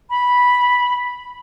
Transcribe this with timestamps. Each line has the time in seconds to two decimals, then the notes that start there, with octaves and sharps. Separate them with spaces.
0.10 B5